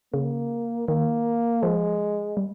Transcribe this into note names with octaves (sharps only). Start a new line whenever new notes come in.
C#3 A#3
D#3 A#3
F3 G#3
G3